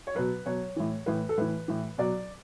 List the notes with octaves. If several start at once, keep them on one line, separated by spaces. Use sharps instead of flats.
C#5
B2 F#3 B4
B2 F#3 C#5
A2 E3
A2 E3 B4
A4
A2 E3 B4
A2 E3
B2 F#3 D5